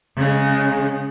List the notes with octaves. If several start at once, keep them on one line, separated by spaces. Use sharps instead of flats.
C#3 G#3